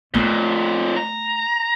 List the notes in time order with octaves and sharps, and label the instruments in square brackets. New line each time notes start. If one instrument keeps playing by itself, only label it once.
[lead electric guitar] F2 A#2 [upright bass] A3 B3
[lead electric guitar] A#5